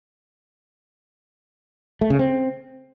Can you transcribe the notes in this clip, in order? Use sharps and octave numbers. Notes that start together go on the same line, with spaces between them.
A3
C#3
C4